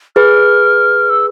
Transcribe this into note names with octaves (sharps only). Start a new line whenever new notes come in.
G#4 B4 F6
E6